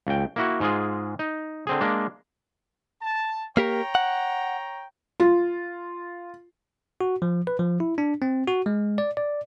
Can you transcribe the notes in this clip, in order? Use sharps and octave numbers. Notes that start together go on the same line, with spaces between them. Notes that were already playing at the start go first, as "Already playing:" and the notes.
C#2 G5
A#3 E4 F#4
G#2 G#3 F4 G#4
D#4
D3 C4 G#4
G#3 A#3 D4
A5
A#3 G4 A#4 C#5 G5 A#5
F#5
F4
F#4
F3
B4
F3
E4
D4
C4
F#4
G#3
D5
D5